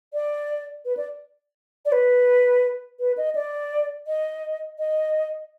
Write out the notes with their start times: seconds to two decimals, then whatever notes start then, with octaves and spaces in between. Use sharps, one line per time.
0.13 D5
0.85 B4
0.97 D5
1.85 D5
1.92 B4
3.00 B4
3.17 D#5
3.35 D5
4.07 D#5
4.79 D#5